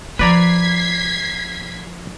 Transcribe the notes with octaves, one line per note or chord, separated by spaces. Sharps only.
F3 B4 D5 A#5 G#6 B6 C7